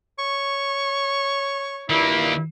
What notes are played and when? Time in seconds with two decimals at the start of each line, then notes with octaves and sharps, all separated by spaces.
0.19 C#5 C#6
1.90 G2 A#2 D#3 A#3 E4